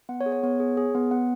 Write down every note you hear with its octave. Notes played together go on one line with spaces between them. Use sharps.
B3 F#5
C#5
G#4
C#5
B3 C#5
G#4
G#4
B3
B3 F#5